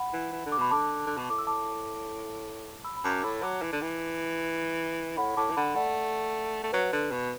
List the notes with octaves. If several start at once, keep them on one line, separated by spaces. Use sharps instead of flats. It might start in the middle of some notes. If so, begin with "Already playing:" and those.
Already playing: F#5 B5
E3
E3
D3
D6
B2 B5
D3 A5 D6
D3
B2
A2 D6
E6
A5 D6
B5 E6
B5
F#2 A5 D6
D6
A2 B5 E6
F#3 A5 D6
E3
D3
E3
A2 F#5 B5
A2 A5 D6
E3
D3 F#5 B5
A3 D5 F#5
A3
F#3 B4
D3
B2